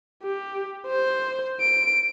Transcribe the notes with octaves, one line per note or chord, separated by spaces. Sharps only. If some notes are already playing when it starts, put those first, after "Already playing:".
G4
C5
D7